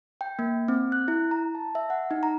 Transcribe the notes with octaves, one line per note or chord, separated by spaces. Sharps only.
G5
A#3
C4
F#6
E4
A#5
A5
E5
F#5
D#4
A#5